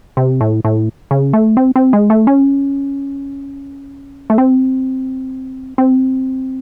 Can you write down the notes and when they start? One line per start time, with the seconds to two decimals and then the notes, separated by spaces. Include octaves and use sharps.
0.17 C3
0.41 A2
0.65 A2
1.11 C#3
1.33 A3
1.57 C4
1.76 C4
1.93 G#3
2.10 A3
2.27 C#4
4.30 A3
4.38 C4
5.78 C4